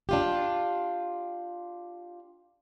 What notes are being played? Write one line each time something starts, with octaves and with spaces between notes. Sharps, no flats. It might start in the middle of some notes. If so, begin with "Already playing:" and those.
D4 F4 G4